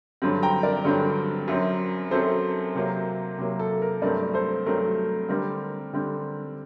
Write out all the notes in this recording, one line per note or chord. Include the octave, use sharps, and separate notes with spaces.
G2 D3 F#3 C4
G5 A#5
A#4 D5
G2 D3 F#3 C4
F#2 F#3 C4
F#2 F#3 C4 A4 C5
C3 F#3 A#3
C3 F#3 A#3
A4
A#4
G2 F#3 A3 C4 A#4 D5
A4 C5
G2 F#3 A3 C4 A#4
D3 G3 C4 A#4
D3 G3 C4